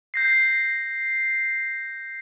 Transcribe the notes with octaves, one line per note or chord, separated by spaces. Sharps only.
G6 A#6 C7